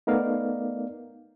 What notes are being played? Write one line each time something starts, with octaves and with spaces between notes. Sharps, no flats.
A3 B3 D#4 A#4 D5 F5